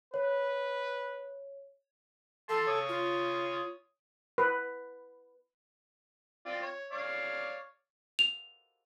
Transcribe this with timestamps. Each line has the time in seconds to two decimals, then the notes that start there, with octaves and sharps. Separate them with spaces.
0.14 B4 C#5
2.49 A4 A5 C6
2.67 C#5 D#6
2.89 F4
4.38 B4
6.46 C4 F4 D5
6.62 C#5
6.92 C#5 D5 F5
8.19 F7